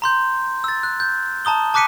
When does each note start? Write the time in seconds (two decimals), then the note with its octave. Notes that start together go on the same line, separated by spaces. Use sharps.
0.02 A#5 C6 G6
0.64 E6 A6
0.83 F#6
1.00 G6
1.45 A5 A#5 D#6 G7
1.74 A5 D6 F#6 B6 C#7 D#7